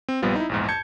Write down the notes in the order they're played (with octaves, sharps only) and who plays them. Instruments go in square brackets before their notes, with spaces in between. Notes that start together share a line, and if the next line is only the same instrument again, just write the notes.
[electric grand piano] C4
A#1 G2 G3 B3 C4 F4
D#4 E4
A#1 E2 G#2
A5 G6 G#6 C#7